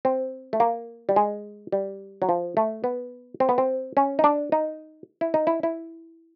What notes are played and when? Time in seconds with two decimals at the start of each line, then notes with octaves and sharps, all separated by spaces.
0.05 C4
0.53 A3
0.60 A#3
1.09 G3
1.16 G#3
1.72 G3
2.22 F#3
2.29 F3
2.57 A3
2.84 B3
3.40 C4
3.49 B3
3.58 C4
3.97 C#4
4.19 D#4
4.24 D4
4.52 D#4
5.21 E4
5.34 D#4
5.47 E4
5.63 E4